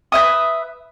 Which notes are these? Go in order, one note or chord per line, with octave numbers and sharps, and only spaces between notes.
B4 C5 E5 D#6